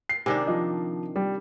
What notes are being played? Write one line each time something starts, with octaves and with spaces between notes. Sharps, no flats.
C7
C3 D#3 D4 D5 G#5
F3 D#5
G3